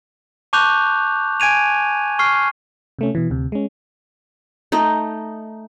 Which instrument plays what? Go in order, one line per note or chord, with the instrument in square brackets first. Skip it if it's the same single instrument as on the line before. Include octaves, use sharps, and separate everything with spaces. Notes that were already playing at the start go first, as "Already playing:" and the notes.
[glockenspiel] A5 C#6 D6 F#6 G6 F7
G#5 G#6 D#7 F7
C#6 F6 C7
[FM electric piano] C3 A3 C#4
B2 E3
D2 C3
G#3 C#4
[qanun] A3 D#4